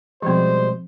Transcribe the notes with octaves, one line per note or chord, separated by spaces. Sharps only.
B2 F3 G3 G#3 C4 C5